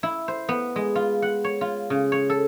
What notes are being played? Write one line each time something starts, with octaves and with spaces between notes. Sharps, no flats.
E4
C5
B3
G#3
F4
F#5
C#5
F4
C#3
C#5
A4